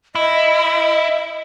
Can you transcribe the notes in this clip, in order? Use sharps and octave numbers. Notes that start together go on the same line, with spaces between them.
E4 D#5